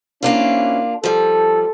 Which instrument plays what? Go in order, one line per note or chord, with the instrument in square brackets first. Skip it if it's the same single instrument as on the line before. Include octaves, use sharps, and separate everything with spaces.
[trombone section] C3 C#4 E4 [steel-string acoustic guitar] A#3 D4 F4
[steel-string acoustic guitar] F3 G3 [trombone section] A4